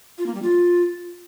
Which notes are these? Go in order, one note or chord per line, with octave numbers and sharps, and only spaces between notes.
F4
A#3
G3
F4